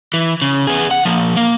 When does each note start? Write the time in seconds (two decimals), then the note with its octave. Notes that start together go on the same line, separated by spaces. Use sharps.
0.14 E3
0.42 C#3
0.67 B3 G#4
0.91 F#5
1.05 F3 A#3
1.36 A#3